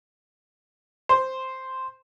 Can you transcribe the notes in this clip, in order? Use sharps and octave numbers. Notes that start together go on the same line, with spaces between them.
C5